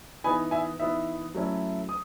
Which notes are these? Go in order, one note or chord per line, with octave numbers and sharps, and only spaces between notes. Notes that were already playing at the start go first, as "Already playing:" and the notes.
E3 B3 D#4 G#5 B5
E5 G#5
E3 B3 D#4 E5
F#3 A3 C#4 E4
D#6